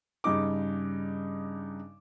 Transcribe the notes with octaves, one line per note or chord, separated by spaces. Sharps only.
G2 C#3 D#4 D6